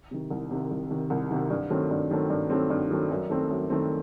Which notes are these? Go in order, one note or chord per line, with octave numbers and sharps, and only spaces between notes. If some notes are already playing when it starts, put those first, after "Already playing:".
C3 D#3
C2
C3 D#3
C2
C3 D#3
C2
C3 D#3
G2
D#3 F#3 A3 C4
G2
D#3 F#3 A3 C4
G2
D#3 F#3 A3 C4
G2
D#3 F#3 A3 C4
F#2
D#3 A3 C4
F#2
D#3 A3 C4